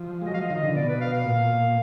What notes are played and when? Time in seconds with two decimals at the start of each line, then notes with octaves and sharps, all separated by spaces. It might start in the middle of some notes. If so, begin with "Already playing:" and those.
Already playing: F3
0.22 G#3
0.26 F#3 D#5
0.34 F5
0.38 F3 D#5
0.48 D#3 F5
0.56 D#5
0.63 D3
0.75 B2 D5
0.88 B4
1.01 F5
1.13 F5
1.25 A#2